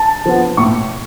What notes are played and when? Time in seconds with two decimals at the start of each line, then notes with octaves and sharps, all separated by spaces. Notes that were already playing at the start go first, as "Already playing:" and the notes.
Already playing: A5
0.26 F3 B3
0.57 A2 C#6